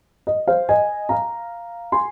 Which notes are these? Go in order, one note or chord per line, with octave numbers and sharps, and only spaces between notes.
D#5
C5 F5
D#5 G#5
F5 A#5
G#5 C6